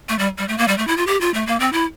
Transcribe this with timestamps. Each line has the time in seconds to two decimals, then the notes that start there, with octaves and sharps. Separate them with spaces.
0.09 A3
0.19 G3
0.38 G3
0.48 A3
0.58 A#3
0.68 G3
0.78 A3
0.88 E4
0.97 F4
1.07 G4
1.21 F4
1.34 A3
1.47 A#3
1.60 C4
1.73 E4